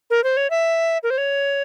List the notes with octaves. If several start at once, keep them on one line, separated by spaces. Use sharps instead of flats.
A#4
C5
C#5
E5
A#4
C5
C#5